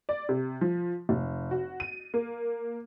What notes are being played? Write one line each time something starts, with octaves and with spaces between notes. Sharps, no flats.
D5
C3
F3
F1
F#4
D#7
A#3